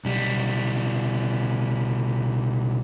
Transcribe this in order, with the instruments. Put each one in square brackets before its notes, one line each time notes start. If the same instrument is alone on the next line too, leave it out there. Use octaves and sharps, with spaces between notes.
[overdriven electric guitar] B1 G3